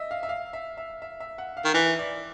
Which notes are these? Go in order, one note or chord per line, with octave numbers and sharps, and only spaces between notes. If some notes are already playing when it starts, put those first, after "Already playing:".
Already playing: D#5 E5
F5
E5
F5
E5
E5
E5
E5
F#5
F5
D#3
E3 E5
D5